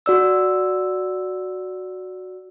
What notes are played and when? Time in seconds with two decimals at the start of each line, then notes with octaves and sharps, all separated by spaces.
0.06 F#4 D5 E6